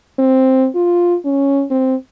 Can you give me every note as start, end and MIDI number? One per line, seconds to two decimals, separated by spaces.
0.19 0.67 60
0.75 1.16 65
1.25 1.64 61
1.70 1.95 60